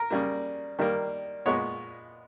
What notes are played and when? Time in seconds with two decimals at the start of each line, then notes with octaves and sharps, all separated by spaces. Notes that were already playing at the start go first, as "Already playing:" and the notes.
Already playing: A#4
0.10 C#3 G3 A#3
0.79 D#3 G3 A#3
1.46 A#2 G#3 B3 C#5